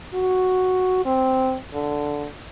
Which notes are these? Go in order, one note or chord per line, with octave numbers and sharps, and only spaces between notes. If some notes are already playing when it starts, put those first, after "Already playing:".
F#4
C4
D3